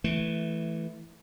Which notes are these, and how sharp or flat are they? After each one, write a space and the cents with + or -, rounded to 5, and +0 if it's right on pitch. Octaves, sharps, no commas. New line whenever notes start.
E3 +0 A3 -10